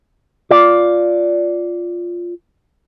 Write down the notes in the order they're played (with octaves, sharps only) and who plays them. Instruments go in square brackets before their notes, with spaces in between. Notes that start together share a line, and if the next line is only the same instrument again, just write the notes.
[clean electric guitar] F4 D5